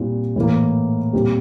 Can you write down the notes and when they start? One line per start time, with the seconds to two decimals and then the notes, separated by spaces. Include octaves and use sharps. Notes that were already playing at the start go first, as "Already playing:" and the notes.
Already playing: A#2 G3 C4 E4
0.36 A2 E3 A#3
1.13 A#2 G3 C4 G4